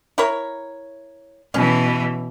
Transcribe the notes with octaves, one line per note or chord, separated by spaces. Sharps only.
E4 A#4 C#5
B2 E3 C#4